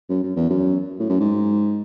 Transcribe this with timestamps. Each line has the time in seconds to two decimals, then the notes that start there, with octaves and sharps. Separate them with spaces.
0.10 F#2
0.23 F#2
0.36 E2
0.50 F#2
1.00 A2
1.09 F#2
1.20 G#2